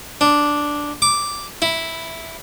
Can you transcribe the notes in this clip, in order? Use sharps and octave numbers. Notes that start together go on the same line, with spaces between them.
D4
D6
E4